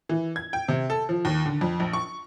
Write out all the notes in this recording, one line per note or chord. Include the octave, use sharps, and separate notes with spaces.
E3
G#6
G5
C3
A4
F3
D#2
D3
F2
A#1
C#6